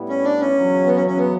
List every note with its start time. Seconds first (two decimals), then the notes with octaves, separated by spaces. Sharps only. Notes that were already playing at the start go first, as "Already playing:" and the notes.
Already playing: A2 G3 B3 E4 G4
0.09 C#4
0.24 D4
0.40 C#4
0.56 E2 C#3 F#3
0.86 B3
0.96 C#4
1.07 C#4
1.18 B3